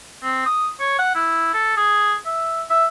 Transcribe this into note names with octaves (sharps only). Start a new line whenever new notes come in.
C4
D#6
C#5
F#5
E4
A4
G#4
E5
E5